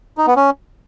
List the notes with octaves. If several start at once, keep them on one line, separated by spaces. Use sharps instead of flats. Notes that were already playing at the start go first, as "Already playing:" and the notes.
D#4
B3
C#4